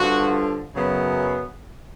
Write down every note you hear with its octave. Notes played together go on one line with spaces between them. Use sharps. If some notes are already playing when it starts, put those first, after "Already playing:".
Already playing: G2 D3 F3 F#4
F#2 C#3 F#3 B3